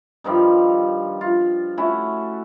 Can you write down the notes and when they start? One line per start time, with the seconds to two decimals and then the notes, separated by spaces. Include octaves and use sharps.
0.24 G2 D#3 F3 G3
1.21 F4
1.77 A3 C#4 E4 F#4